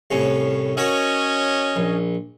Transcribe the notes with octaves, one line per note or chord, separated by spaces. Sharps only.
C2 A2 C#4
C#4 F#4 A#4 C#5 D#5
A#1